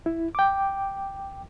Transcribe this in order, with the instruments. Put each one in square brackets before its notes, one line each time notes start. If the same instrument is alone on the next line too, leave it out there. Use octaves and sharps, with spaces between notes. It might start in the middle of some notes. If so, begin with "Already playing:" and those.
[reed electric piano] E4
G5 D6